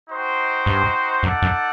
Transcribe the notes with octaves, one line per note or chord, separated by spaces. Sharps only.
D#4 F#4 C5 G5
G2
F#2 D#4 A4 D5 F#5
F#2